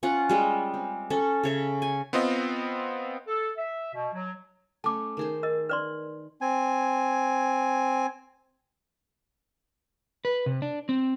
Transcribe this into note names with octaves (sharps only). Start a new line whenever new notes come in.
C#4 F4 F#5
G3 G#3 D#5
C4
C#4 A4
C#3 C#5 E5
G#5
B3 C4 F4 D#5
A4
E5
B2
F#3
A3 C#4 A5 D6
D#3 G#4 C5
A#4 D#5
B4 D5 C6
C4 G#5
B4
C3
D4
C4